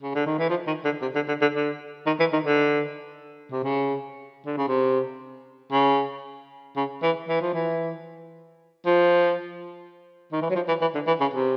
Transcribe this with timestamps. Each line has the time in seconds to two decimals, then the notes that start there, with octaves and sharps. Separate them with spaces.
0.02 C#3
0.15 D3
0.26 D#3
0.39 E3
0.50 F3
0.67 D#3
0.85 D3
1.02 C3
1.15 D3
1.28 D3
1.41 D3
1.54 D3
2.06 D#3
2.19 E3
2.33 D#3
2.46 D3
3.52 C3
3.64 C#3
4.46 D3
4.57 C#3
4.68 C3
5.72 C#3
6.76 C#3
7.03 E3
7.29 E3
7.41 F3
7.54 E3
8.86 F3
10.32 D#3
10.42 E3
10.50 F#3
10.55 F3
10.68 E3
10.81 E3
10.94 D3
11.07 E3
11.21 C#3
11.33 C3